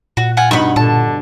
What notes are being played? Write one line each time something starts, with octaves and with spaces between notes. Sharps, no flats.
A#2 F#4
F4 F#5 G#5
G2 B2 D#4 B5 C#6
A#2 D3 A5